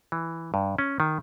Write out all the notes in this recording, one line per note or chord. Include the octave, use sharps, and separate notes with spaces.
E3
G2
C#4
D#3